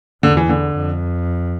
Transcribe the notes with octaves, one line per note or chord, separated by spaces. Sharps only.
E2 D3
E3
D3
F2